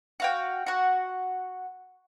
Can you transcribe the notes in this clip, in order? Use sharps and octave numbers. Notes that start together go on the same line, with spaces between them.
F#4 F5 G5
F#4 F#5